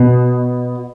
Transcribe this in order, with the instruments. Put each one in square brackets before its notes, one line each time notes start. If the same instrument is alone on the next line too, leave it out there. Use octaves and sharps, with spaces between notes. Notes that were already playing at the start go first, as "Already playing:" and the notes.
Already playing: [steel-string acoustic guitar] B2